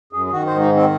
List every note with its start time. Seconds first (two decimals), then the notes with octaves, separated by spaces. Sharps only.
0.13 F#2 G#4
0.26 G#4
0.32 D#3 F#4
0.47 G#2 C5
0.61 D#4
0.71 D#3 C4